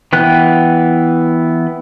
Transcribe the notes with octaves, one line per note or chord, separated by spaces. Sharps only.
E3 B3 B4 G5 F#6